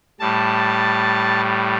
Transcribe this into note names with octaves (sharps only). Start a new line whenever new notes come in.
A2 G3 A5